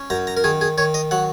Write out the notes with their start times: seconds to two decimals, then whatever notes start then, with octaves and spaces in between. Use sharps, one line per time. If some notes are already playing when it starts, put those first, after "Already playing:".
Already playing: C#4
0.10 F#2 A#5
0.27 A#5
0.37 A#4
0.44 D#3 G#4
0.61 G#4
0.78 D#3 C#5
0.94 D#5
1.11 F#3 F#5